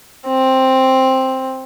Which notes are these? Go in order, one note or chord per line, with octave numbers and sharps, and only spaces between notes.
C4